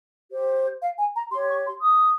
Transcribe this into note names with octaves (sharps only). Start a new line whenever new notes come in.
G4 C5
F5
G#5
A#5
G4 C#5 C6
C#6
C6
D#6